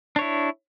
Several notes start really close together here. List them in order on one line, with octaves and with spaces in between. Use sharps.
D4 C#5 E4